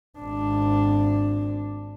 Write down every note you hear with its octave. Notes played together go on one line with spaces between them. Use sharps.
G#1 D4